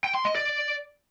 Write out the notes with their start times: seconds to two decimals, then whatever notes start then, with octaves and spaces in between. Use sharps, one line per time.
0.04 G5
0.15 C6
0.25 D#5
0.35 D5